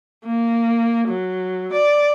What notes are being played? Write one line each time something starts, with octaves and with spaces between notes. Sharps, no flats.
A#3
F#3
D5